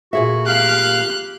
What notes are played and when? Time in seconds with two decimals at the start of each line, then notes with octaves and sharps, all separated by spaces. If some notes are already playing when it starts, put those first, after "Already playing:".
0.13 A#2 F#4 G#4 E5
0.46 G4 F5 F#6